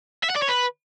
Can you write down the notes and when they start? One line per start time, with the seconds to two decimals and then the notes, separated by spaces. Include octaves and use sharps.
0.24 E5
0.30 F#5
0.36 D5
0.43 C#5
0.49 B4